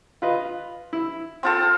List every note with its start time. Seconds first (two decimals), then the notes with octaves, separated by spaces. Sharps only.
0.22 F4 B4 D#5
0.93 E4
1.43 C4 F4 A4